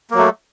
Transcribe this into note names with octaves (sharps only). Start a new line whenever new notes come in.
F#3 A3 A#3